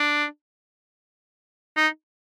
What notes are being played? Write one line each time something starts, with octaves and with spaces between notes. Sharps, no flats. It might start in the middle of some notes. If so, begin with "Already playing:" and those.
Already playing: D4
D#4